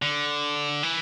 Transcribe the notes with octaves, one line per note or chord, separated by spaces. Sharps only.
D3
E3